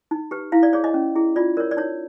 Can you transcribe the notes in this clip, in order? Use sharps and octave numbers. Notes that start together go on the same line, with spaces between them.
D#4
G4 B4
E4 F5
D5
G#4 C#5 D5
D#5
C#4
E4 G#4
F4 D5
A#4 C#5 D5
D5
D#4 C#5